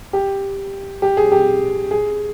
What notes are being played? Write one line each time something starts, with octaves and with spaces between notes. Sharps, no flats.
G4
G4
G#4
G4
G#4